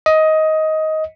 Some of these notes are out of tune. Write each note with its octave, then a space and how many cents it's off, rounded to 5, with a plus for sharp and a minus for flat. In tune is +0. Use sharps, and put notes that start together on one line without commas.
D#5 +15